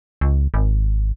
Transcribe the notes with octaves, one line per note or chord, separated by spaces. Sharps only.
C#2
G#1